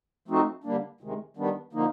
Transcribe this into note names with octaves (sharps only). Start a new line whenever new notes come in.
F3 A3 C4 D#4 F#4
D3 G3 A#3 D4
D2 C3 D#3 G#3
D#3 G3 B3 D4
D3 F3 A#3 D#4